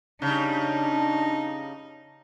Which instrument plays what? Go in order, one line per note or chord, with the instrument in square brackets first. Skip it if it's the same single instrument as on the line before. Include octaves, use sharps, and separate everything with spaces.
[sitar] C#3 G3 [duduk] D4 [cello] D#4